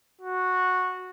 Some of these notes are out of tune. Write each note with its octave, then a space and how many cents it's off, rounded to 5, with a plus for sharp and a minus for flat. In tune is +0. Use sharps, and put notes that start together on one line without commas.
F#4 -10